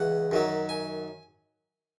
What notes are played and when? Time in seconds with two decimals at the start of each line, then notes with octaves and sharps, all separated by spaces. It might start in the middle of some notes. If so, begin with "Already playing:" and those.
Already playing: C#2 C#3 E3 F#5
0.31 F#2 D#3 F#3
0.69 G#5